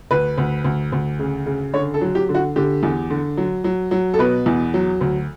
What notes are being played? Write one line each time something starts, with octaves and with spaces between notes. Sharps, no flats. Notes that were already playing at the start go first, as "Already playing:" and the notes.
D2 B4
D2
D2
D2
C#3
C#3
D3 C#5
A4
F#3
G4
D3
F#4
D3 G4
E2
D3
F#3
F#3
F#3
A4
B2 B4
E2
F#3
D2